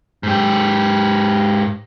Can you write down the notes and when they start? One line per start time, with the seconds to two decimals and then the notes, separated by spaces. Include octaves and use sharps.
0.23 G#2 G4